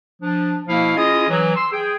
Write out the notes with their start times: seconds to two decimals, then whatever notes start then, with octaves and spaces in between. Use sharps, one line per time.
0.22 F3 D4
0.68 B2 F3 A#3 E4 F5
0.96 C#4 E4 F4 G#4 D#5
1.29 E3 F#3
1.56 C6 E6
1.73 G#4 G5